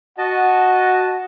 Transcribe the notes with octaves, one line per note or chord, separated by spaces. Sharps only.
F#4 D#5 F#5 A5